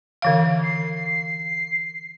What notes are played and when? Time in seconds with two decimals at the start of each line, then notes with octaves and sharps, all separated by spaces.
0.22 D3 E3 F5
0.63 C7